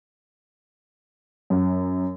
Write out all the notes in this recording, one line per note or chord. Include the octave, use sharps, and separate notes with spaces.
F#2